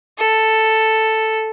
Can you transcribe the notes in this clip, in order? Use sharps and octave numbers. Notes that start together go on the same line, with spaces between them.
A4